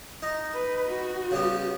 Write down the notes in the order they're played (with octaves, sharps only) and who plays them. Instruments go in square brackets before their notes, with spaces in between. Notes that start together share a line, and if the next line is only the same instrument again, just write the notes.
[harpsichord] D#4
[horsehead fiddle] B4
F#4
[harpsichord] C#3 G3 B3